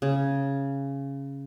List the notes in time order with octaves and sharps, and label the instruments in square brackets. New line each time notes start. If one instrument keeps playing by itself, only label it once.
[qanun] C#3